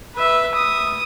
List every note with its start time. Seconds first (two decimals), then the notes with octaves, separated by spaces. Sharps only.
0.15 B4 E5
0.54 D#6